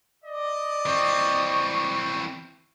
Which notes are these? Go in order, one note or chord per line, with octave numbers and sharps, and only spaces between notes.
D5 D#5
E3 C4 C#6